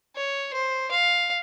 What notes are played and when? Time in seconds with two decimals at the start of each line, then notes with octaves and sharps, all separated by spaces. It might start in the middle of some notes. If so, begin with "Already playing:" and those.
0.16 C#5
0.53 C5
0.91 F5